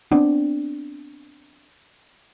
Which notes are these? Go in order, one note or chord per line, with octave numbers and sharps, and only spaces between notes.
B3 C4 D4